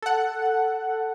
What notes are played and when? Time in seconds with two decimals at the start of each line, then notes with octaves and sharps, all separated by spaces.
0.02 A4 F#5